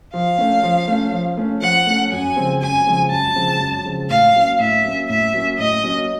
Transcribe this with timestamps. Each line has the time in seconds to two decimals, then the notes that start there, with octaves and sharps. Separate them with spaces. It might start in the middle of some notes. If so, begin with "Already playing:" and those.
0.14 F3 F5
0.38 A3 C#4
0.63 F3
0.88 A3 C#4
1.13 F3
1.37 A3 C#4
1.62 F3 F#5
1.87 A3 C#4
2.11 F#2 G#5
2.36 C#3 F3 G#3 C4
2.62 F#2 G#5
2.86 C#3 F3 G#3 C4
3.11 F#2 A5
3.36 C#3 F3 G#3 C4
3.60 F#2
3.85 C#3 F3 G#3 C4
4.10 A2 F5
4.35 F#3 A#3 C#4
4.59 A2 E5
4.85 F#3 A#3 C#4
5.08 A2 E5
5.34 F#3 A#3 C#4
5.59 A2 D#5
5.83 F#3 A#3 C#4